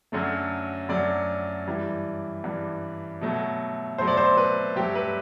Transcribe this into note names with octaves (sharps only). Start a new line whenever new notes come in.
F#2 D3 F#3 A3
F#2 D3 F#3 A3 D5
G2 E3 G3
G2 E3 G3
B2 F#3 A3
B2 F#3 A3 C5
D5
C5
B4
G2 F#3 A3 G4
B4